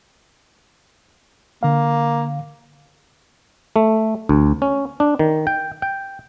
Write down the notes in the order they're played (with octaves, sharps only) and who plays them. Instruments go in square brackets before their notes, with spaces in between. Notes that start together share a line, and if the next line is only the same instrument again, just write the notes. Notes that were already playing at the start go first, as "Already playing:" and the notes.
[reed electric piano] D3 F5 [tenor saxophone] A#3
[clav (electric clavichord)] A3
D2
C#4
D4
D#3
G5
G5